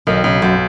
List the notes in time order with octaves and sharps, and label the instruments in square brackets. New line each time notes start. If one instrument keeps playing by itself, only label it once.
[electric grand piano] B1 [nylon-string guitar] D#3
[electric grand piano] B1 [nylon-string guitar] C#3
[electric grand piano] B1 [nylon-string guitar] F#2